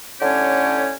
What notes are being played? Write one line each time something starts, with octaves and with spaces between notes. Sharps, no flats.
A2 D3 C#4 G4 C#5